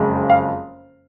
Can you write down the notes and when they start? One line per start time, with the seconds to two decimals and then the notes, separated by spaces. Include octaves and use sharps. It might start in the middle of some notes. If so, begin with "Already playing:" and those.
Already playing: F#1 F2 C#3 G#3
0.30 F5